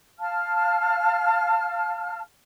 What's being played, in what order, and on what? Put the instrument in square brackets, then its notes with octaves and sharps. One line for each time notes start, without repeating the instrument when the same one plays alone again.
[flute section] F5 A5 F6